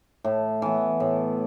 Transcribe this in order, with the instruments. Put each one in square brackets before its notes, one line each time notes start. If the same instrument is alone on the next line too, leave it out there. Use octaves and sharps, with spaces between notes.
[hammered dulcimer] A2
E3 B3
A2